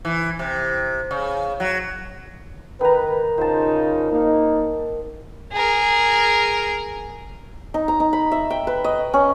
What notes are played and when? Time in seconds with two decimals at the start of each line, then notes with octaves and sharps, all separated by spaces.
0.05 E3
0.39 C3
1.11 C#3
1.60 F#3
2.81 D#3 B4 A#5
3.38 C#3 D#4 F4 C5 A5
4.12 A#3 D#4
5.52 G#4 A#4
7.74 D#4
7.88 A#5
8.00 D#4
8.13 B5
8.31 E5
8.50 G5
8.67 B4
8.84 D#5
9.13 C#4